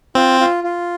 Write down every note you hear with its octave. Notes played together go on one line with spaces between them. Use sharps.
C4 F4
F4
F4